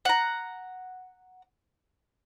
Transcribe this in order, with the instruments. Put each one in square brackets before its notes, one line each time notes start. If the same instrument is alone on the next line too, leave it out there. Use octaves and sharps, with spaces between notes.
[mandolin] F#5 A#5